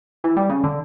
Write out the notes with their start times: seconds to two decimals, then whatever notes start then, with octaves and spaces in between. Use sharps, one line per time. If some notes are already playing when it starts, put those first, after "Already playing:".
0.24 E3
0.37 G3
0.50 C#3
0.64 D3